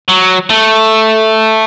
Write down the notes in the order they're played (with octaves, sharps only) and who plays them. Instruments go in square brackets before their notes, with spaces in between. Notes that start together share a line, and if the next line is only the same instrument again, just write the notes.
[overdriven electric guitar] F#3
A3